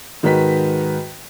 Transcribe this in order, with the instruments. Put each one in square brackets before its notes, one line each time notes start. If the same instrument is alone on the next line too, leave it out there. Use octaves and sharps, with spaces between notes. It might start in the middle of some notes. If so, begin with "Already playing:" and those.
[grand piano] G#2 D#3 F#4 B4 B6